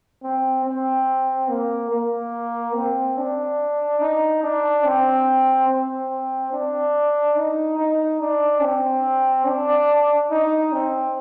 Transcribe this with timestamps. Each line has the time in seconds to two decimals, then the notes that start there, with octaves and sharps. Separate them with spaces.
0.24 C4
0.65 C4
1.50 A#3
1.91 A#3
2.75 C4
3.18 D4
4.01 D#4
4.44 D4
4.85 C4
5.69 C4
6.53 D4
7.36 D#4
7.79 D#4
8.20 D4
8.63 C4
9.46 D4
10.31 D#4
10.72 C4